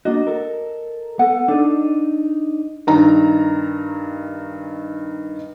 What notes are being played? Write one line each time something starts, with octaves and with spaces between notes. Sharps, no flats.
A#3 D4 F#4 D#5
A4 A#4
B3 A4 F#5
D4 D#4 A4
G2 D#3 D#4 A#5